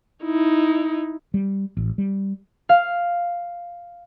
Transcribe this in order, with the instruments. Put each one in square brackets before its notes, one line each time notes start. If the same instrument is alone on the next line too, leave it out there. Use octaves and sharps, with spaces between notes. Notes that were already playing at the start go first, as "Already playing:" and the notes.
[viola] D#4 E4
[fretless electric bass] G3
A1
G3
[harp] F5